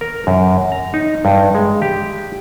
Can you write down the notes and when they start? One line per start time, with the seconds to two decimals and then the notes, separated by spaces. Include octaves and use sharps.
0.01 A#4
0.27 F#2
0.72 A#5
0.94 D#4
1.25 G2
1.55 G#3
1.82 G4